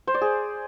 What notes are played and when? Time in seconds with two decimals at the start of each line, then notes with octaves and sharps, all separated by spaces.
0.07 C5
0.14 D5
0.21 G#4